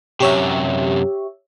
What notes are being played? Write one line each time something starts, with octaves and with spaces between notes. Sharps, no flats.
F#2 C3 G4 C#5 E5